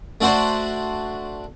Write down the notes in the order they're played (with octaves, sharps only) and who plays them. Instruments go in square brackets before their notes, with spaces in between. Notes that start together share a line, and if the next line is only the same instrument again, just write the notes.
[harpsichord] A3 D4 F#4 C5 D5